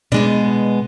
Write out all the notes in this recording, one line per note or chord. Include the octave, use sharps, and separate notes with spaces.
B2 G#3 B3 D4